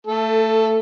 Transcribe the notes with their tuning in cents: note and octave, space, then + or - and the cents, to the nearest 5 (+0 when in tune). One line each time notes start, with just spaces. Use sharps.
A3 +20 A4 +0